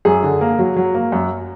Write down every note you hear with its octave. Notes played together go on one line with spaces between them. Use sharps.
F#2 G#4
D3
A#3
F#3
F#3
A#3
F#2